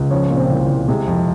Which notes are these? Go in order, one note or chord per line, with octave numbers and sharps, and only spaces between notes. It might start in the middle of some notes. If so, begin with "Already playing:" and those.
Already playing: C#2
F3 C#4 C#5
A#2
C4 C5
C2
C2
C3 G#3 G#4
F2